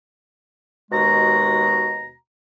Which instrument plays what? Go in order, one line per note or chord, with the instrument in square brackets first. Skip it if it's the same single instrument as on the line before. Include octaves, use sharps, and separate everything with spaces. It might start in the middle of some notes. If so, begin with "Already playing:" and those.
[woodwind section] D#2 B2 G#3 F#4 A#5